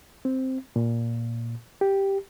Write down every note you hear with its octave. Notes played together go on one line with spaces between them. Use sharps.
C4
A#2
G4